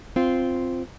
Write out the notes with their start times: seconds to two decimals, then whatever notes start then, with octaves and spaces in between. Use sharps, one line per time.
0.16 C4 F4